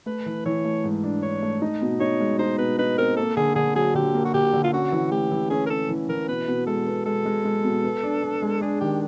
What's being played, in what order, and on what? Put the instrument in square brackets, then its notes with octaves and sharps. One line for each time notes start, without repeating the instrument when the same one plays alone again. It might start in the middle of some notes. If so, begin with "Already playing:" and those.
[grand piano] A3 [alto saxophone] B4
[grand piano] E3
[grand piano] E3 [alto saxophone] C#5
[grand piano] A3
G#2
D4
[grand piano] D4 [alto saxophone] C#5
[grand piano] A3
D#4
B2
[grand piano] D#4 [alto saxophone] C#5
[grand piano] G#3
[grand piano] D#4 [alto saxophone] C5
[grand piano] B2 [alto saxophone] B4
[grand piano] D#4 [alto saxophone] B4
[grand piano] C4 [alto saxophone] A#4
[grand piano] A#3 [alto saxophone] A4
[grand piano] D3 [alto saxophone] G#4
[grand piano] D3 [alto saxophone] G#4
[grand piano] F#3 [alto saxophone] G#4
[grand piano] D3 [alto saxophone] G4
[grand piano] A#3
[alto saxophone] F#4
[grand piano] D3 [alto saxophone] G4
[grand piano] D3
[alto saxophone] F4
[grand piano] C#4 [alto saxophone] F#4
[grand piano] E3
[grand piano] A3 [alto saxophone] G4
[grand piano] E3
[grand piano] C#4 [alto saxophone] G#4
[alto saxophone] A#4
[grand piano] C#4 [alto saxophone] A4
[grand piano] E3
[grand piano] E3 [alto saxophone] A#4
[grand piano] B2 [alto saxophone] B4
[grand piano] B2
[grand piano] G#3 [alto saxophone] A4
[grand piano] B3
[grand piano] G#3 [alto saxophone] A4
[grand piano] G#3
G#3
B2
B3
D4
D4
G#3
[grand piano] D4 [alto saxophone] G#4
[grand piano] D#3 [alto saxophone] G4